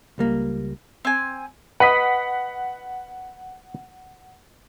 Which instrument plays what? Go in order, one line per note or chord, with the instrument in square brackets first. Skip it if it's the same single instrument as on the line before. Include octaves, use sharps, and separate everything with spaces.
[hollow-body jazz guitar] C#2 G3 A#3
[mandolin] C4 G#5
[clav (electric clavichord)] B4 D#5 [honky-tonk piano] F#5 B6